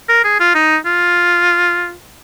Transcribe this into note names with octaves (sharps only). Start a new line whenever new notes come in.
A#4
G#4
F4
D#4
F4